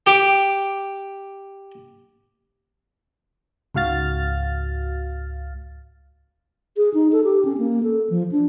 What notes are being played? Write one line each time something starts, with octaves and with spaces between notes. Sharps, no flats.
G4 D6
C#2 G#2 F#4 F5 F6 A6
G#4
D#4
A4
G4
C#4
A#3
A4
F3
D4